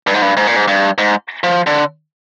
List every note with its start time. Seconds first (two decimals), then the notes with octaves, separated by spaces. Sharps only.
0.07 G2
0.14 G#2
0.22 G2
0.37 G#2
0.47 A#2
0.56 G#2
0.68 G2
0.98 G#2
1.43 F3
1.67 D3